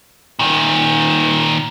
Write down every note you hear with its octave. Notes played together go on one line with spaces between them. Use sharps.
A#2 D#3